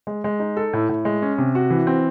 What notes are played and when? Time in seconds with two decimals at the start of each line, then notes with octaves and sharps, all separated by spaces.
0.07 G#3
0.24 G#3
0.40 D#4
0.57 A4
0.73 A2
0.89 A2
1.05 G#3
1.22 C#4
1.38 C3
1.55 F#4
1.70 E3
1.87 C4